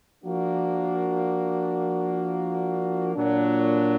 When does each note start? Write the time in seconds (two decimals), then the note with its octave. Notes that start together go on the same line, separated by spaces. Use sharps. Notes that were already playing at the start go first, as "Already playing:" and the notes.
0.24 F3 A#3 D4 F#4
3.15 A#2 F#3 D4